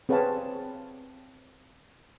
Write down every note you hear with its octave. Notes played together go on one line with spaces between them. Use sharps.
C4 G#4 B4 C#5 F5 A5